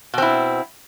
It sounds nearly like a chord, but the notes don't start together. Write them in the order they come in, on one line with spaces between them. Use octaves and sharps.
B2 C4 E4